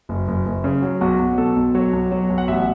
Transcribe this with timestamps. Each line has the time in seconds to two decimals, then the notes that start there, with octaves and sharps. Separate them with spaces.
0.09 F#1
0.28 F#1
0.46 F#1
0.64 C#3
0.82 F#3
1.01 B1 F#4
1.20 B1
1.38 B2 A4
1.56 B1
1.75 F#3 C#5
1.93 B1
2.12 F#3
2.30 B1
2.38 F#5
2.48 A1 E5